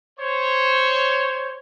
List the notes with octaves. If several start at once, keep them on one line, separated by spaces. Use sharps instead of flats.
C5 C#5